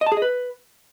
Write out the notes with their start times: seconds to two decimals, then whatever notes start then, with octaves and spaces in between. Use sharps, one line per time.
0.01 D#5
0.06 A5
0.12 G#4
0.17 D#5
0.22 B4